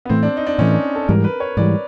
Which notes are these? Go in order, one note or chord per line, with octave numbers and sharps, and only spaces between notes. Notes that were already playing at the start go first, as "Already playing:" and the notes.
B3
A2 E3 A3 C4
D4
D#4
D4
A2 E3 A3 C#4
D4
A4
G#2 E3 G3 A#4
B4
C#5
G#2 E3 G3 D5